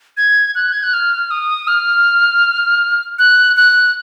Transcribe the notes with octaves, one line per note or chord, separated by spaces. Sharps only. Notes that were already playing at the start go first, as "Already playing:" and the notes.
G#6
F#6
G#6
F#6
F6
D#6
F6
F#6
F#6